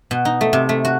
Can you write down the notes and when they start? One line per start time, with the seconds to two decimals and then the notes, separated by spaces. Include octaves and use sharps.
0.11 B2
0.25 D#4
0.41 A3
0.53 C3
0.69 A3
0.85 F#4